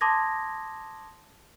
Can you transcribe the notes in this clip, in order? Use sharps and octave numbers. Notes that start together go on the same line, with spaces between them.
A5 C6 D6 D#6 G#6 A#6